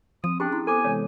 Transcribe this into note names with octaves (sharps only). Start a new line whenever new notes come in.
F3 C4 D#6
C#4 D4 G4 G#4 G5
E4 C6
B3 A4 C5 G#5 D6
C3 E3 G#3 C#5